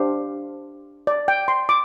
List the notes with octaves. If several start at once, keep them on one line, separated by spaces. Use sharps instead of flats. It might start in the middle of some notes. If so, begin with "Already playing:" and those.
Already playing: D4 G4 C5 F5
D5
G5
C6
D6